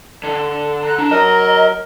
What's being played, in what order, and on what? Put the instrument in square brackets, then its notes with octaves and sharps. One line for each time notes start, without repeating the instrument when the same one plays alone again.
[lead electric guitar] D3
[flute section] A#5 F#6
[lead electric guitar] D4 [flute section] A#5
[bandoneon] F#3 A#4 [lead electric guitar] D#5